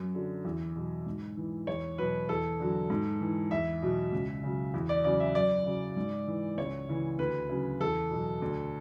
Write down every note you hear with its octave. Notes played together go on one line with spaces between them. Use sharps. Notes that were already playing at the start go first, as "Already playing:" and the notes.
Already playing: F#2
D3 F#3
E2
B2 F#3
G#2
E3
E2 C#5
B2 F#3 B4
E2 A4
D3 F#3
G#2
E3
E2 E5
B2 F#3
C#2
C#3 F#3
E2
D5
C#3 F#3 D5
E5
F#2 D5
C#3 F#3
G#2
E3
C#2 C#5
C#3 E3
D2 B4
C#3 F#3
E2 A4
B2 F#3
D2